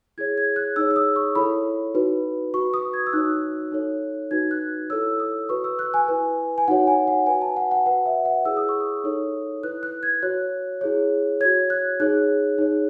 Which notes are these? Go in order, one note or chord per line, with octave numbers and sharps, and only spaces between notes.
E4 G#4 C#5 G#6
G#6
F#6
D#4 G#4 C#5 E6
E6
D#6
C#6
E4 A4 C#5 B5
D#4 F#4 B4
F#4 B4 C#6
D#6
G#6
E6
D#4 F#4 C#5 F#6
D#4 A4 C#5
D#4 F#4 B4 G#6
F#6
E4 A4 C#5 E6
D#6
F#4 B4 C#6
E6
F#6
G#5
E4 B4
G#5
D#4 F#4 C#5 F#5
G#5
F#5
F#4 B4 G#5
A5
F#5
F#5
F#4 B4 F#5
E5
F#5
E4 G#4 C#5 E6
D#6
C#6
D#6
D#4 A4 C#5
E4 B4 F#6
F#6
G#6
F#4 C#5 F#6
E4 G#4 C#5
F#4 C#5 G#6
F#6
D#4 G#4 C#5 F#6
D#4 G#4 C#5